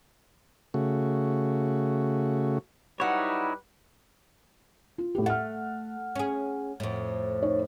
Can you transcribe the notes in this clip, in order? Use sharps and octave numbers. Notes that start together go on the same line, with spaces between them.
C#3 A3 F#4
F#3 G3 D#4 E4 B4 C#5 F#5
F4
A2 G4
A3 F#5 F6
C#4 G#4
F2 A2
D#4 C#5